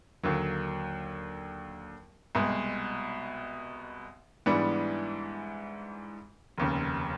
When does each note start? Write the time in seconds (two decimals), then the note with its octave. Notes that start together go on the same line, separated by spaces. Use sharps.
0.23 D#2 D3 F#3 A#3
2.35 C2 B2 G#3
4.46 G#2 E3 G3 B3 D4
6.58 F1 D#2 C#3